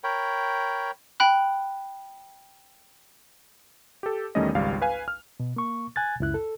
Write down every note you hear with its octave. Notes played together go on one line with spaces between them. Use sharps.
A#4 C#5 G5 B5
G5 B5 F#6
G4 A4
E2 D#3 G3 A3 C#4 D#5
G#1 C#2 G3 F5
B4 F5 G#5
F6
B2
A#3 C#6
G#5 F#6 G#6 A6
C#2 F#2 E4 F#6
A4